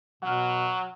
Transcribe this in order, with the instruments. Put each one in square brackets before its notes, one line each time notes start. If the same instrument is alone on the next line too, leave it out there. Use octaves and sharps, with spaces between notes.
[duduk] B2 [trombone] F#3 [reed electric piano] F#5 F6